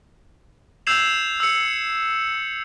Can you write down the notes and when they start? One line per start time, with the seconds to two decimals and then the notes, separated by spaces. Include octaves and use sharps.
0.87 E6 G6 G#6 C7 E7 F7
1.40 E6 C#7